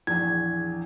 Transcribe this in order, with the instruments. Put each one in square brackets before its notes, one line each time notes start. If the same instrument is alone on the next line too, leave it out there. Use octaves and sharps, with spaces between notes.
[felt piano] A#1 E2 E3 [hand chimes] G#6